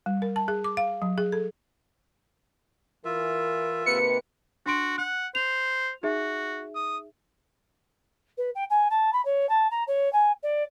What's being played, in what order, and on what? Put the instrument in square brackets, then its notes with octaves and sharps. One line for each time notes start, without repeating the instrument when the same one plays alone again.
[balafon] G3
A#4
A5
G#4
D6
F5
F#3
G#4
A4
[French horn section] E3 A#4 [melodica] F4 E5
[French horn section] G#2 C3 A#3 [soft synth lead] B4 [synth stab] C#7
[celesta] D4 C6 D7 [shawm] F#4
[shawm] F#5 [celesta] F#6
[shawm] C5 [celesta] F7
[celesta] D#4 G#4 E5 [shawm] F#4
[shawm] D#6
[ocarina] B4
G5
G#5
A5
B5
C#5
A5
A#5
C#5
G#5
D5